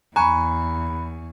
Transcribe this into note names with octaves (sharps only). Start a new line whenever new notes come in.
E2 G#5 A#5 B5 C#6 F#6